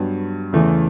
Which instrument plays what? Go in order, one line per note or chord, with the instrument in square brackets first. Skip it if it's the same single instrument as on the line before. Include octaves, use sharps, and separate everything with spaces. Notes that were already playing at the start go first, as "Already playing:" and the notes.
Already playing: [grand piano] G2 F#3 B3
E2 C#3 E3 A3